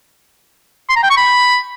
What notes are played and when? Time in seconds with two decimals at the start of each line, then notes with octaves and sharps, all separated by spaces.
0.89 C6
0.96 A#5
1.03 G5
1.10 C#6
1.17 B5